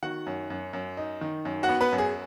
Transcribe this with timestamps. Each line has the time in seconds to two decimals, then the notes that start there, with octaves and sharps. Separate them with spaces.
0.03 D#3 F#4 F#5
0.27 F#2
0.50 F#2
0.73 F#2
0.97 D#4
1.21 D#3
1.45 F#2
1.63 F#4 F#5
1.69 B3
1.81 B3 B4
1.92 F#2
1.98 G#4